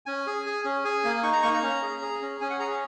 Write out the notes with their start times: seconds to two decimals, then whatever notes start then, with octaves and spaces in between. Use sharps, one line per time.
0.06 C#4 G#5
0.27 G#4
0.46 G#4
0.64 C#4
0.85 G#4 G#5
1.04 A#3
1.23 D#4 C#6
1.33 A#5
1.43 A#3 C#6
1.53 A#5
1.63 C#4
1.82 G#4
2.02 G#4
2.22 C#4
2.41 C#4 G#5
2.50 F#5
2.60 G#4 A#5